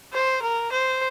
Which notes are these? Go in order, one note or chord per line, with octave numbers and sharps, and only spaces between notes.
C5
A#4
C5